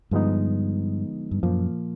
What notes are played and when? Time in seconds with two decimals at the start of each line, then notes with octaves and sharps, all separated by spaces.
0.11 G2 D3 F3 G#3 B3 D#4
1.31 G2
1.43 F#2 A#2 F3 A#3